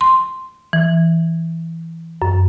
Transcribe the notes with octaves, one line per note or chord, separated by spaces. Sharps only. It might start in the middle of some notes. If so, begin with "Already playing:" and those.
C6
E3
F#2